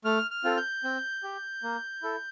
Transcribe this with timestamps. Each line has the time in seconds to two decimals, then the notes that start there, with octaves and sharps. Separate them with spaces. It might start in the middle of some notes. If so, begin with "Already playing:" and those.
0.05 A3 F6
0.31 F6
0.44 C4 F4 A4
0.57 G6
0.84 C4
1.23 G4
1.63 A#3
2.02 E4 A4